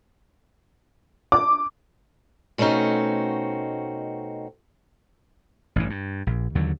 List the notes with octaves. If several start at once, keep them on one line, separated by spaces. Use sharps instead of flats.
D6
B2 A3 C4 C#4 D#4 F#4
A1 G2 E3
G2
A#1
D#2 D3 F#3